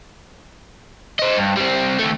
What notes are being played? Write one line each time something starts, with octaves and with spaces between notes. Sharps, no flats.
C5 D#5
G2
G3 C4
D#2 A3